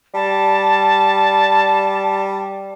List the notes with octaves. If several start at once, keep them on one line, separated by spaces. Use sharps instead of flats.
G3 A5